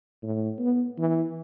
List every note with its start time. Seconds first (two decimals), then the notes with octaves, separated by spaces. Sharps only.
0.23 A2
0.59 B3
0.98 E3